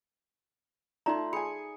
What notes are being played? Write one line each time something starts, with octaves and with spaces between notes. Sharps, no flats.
A3 D#4 F4 D5 A#5 C6
G#4 G#5 B5 C#7